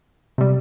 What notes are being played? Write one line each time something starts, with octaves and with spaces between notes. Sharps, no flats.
C3 G3